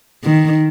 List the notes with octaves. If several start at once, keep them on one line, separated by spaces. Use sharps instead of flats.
D#3